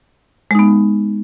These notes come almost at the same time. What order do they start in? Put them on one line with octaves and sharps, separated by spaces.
G#3 D#4 B3